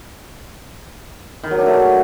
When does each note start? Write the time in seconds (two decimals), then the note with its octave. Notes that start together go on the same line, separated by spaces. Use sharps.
1.44 D#3
1.51 F#3
1.58 D4
1.66 A3
1.73 F#4